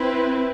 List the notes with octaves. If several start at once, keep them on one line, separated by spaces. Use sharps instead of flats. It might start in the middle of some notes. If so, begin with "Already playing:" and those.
Already playing: C4 E4 B4